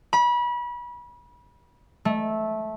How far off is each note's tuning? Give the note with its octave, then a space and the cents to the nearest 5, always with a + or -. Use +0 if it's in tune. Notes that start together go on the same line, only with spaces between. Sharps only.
B5 -30
A3 -15